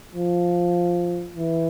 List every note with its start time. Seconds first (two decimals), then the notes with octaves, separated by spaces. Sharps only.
0.15 F3
1.37 E3